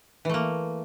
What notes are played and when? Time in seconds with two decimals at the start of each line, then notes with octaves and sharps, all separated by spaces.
0.25 E3
0.29 A3
0.34 A#3